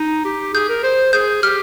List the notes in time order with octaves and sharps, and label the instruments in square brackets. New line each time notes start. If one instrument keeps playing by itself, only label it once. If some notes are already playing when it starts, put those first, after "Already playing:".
Already playing: [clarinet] D#4
G4
[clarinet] G#4 [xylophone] G6
[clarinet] A#4
C5
[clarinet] G#4 [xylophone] G6
[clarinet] G4 [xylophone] F6